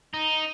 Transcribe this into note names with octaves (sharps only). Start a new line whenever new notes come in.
D#4